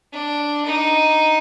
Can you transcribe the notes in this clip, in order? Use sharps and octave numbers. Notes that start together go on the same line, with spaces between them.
D4
D#4